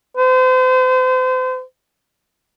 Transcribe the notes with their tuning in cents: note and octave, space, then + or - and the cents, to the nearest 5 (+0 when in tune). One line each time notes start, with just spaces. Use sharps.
C5 -35